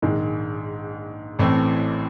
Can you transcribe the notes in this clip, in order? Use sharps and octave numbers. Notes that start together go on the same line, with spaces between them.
A#1 G#2 D#3 G#3
A1 A2 E3 A3 C4